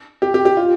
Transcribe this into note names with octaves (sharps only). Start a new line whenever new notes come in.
G4
G4
G4
F4